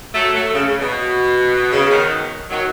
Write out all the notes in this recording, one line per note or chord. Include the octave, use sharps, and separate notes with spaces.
F#3 A3
F#3 A3
C#3
C#3
B2
C#3
B2 D#3
D#3 F#3